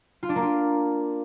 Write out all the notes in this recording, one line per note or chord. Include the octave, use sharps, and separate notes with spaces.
F4
D4
A#3
F4